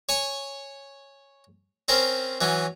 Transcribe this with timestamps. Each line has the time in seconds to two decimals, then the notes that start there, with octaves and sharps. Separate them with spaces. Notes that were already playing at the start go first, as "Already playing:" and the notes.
0.09 C#5 G#5 C#6
1.88 C4 C#4 A#4 C5
2.41 E3 F#3 C#4